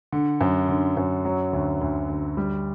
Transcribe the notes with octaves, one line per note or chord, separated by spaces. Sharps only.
D3
F#2
D3
F#2
F#3
D2
D2
D2
G3